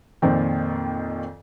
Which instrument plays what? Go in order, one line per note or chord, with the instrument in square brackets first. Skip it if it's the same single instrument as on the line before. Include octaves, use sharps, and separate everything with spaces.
[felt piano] F2 A#2 D#3 C4